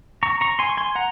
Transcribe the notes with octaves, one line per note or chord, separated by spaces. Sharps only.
A#5 C#6
A#5 C#6
G#5 C6
C#6
G#5 C6
F#5 A#5